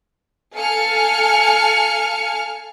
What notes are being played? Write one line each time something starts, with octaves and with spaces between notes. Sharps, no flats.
A4 F5 G#5 A5 F6 C#7